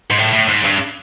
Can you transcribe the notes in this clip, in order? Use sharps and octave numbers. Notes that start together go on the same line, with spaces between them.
G#2
A2
A2
G#2
G2